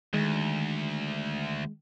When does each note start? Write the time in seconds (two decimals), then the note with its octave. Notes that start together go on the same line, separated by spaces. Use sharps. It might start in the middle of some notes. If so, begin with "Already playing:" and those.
0.14 D2 D#3 G#3